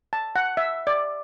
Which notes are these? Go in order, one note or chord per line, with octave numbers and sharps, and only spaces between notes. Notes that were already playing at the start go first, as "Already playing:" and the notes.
A5
F#5
E5
D5